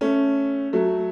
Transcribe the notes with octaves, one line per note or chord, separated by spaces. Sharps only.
A3 C#4
F#3 A3